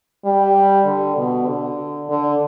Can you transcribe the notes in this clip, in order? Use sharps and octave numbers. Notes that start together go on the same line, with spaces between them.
G3
D3
B2
D3
D3